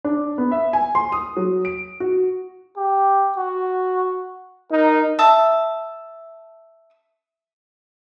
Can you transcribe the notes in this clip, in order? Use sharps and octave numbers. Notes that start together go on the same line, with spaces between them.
D4
B3
E5
G#5
C6
D#6
F#3
D7
F#4
G4
F#4
D#4 A#4
E5 A5 D#6